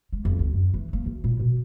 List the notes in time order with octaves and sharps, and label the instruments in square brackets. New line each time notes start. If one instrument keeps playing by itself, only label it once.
[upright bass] G#3
F2
D2
F#2
E3
A#3
D2
A#2
B2